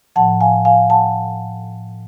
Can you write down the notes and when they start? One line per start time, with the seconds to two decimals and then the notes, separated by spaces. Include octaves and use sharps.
0.16 A2 F3 F#5 A5
0.41 F5 G#5
0.65 F5 G#5
0.90 F#5 A5